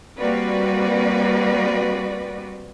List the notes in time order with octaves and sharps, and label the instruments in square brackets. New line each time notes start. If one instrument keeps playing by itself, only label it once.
[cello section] G3 A#3 C4 F#4 B4 D5